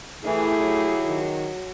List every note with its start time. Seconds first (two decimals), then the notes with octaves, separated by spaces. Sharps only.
0.25 E3 A3 E4 G4 G#4
0.61 F#3
1.04 D#3